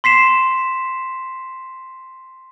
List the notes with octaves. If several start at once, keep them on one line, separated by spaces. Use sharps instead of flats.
C6 B6 C7 E7